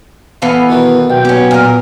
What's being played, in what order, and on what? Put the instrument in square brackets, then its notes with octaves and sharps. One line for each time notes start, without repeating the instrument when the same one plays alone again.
[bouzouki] E3 A4 F5 [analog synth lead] B3
[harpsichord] B2 D#3
[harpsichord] B1 [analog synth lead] G5
[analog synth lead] B3 [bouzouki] C#4 G4
[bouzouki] A#2 G4 A#4